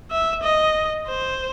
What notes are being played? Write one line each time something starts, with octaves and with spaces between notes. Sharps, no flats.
E5
D#5
C5